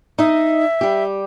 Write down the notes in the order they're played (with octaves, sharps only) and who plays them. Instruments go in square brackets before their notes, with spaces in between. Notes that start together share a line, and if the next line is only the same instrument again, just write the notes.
[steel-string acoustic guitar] D#4 D#5 [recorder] E5
[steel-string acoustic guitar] G3 G4